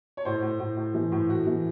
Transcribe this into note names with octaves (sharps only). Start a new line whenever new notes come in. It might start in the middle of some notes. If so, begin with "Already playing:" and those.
C#5
A2 C5
A2
A2
A2
E3
A2
A2 F#4
E3